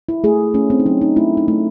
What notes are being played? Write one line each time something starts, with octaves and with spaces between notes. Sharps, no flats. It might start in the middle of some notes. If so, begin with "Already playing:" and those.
E4
A3 G#4
A3 C#4
C4
D#4
F#3 C#4
D#4
A3 E4
D#4
A3